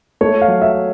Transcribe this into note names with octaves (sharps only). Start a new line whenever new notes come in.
A3 C#5
F5
F#3
E5